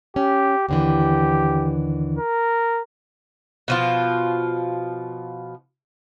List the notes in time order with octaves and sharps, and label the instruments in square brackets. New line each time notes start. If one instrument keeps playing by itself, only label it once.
[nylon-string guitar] C#4 [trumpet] G4
[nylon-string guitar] D#2 D3 E3 [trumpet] G4
[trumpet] A#4
[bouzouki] B2 F3 F4